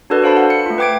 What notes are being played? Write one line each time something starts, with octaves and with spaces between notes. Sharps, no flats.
D4 F#4 A4 B4 D5
A4 C5 F5 A5 B5
F#5 A5
C#7
A3 F4
B4 G5 D6 G#6 D7